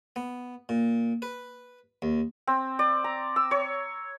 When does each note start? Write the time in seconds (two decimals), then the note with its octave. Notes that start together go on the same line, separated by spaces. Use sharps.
0.16 B3
0.69 A#2
1.22 B4
2.02 D#2
2.47 C4
2.79 D5
3.04 A#5
3.36 E6
3.51 C#5